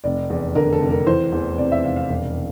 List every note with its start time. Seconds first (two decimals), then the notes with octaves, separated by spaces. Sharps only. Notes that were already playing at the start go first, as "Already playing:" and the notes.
0.04 F1 D5
0.30 E2
0.55 D3 A#4
0.73 A4
0.81 F1
0.90 A#4
1.06 E3 C5
1.32 E2
1.58 C3 D5
1.72 E5
1.84 F1 F5
1.96 F5
2.10 E1